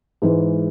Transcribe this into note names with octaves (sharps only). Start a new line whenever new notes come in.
G#2 E3 G#3